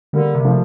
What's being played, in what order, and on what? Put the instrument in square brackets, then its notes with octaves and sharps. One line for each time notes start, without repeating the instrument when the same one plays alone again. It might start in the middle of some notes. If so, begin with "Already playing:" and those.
[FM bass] D3 [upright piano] G3 A#3
[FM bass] C3
[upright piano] F3 A3